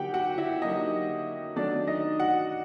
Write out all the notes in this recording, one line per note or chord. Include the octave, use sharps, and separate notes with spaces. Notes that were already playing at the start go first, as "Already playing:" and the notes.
Already playing: D3 F#3 A#3 D#4 G4 F#5 G5
F#4 F#5
E4 E5
D3 F#3 A#3 D#4 D#5
D#3 F#3 A3 D4 D5
D#4 D#5
F#4 F#5